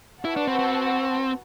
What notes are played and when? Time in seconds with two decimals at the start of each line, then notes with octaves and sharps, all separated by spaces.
0.24 E4 F#4 B4 F#5 A5
0.36 D4
0.47 C4
0.59 C4